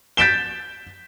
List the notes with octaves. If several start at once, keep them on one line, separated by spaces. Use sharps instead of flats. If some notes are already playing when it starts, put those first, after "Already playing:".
G6 A6 B6 D7 E7 G7